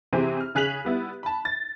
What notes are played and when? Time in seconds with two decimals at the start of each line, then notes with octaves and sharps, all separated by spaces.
0.13 C3 E3 C4 G4 G#4 C5
0.40 F6
0.55 C#3 G#4 F#6 B6 F7 F#7
0.85 G3 B3 E4
1.23 A5 B5
1.45 A6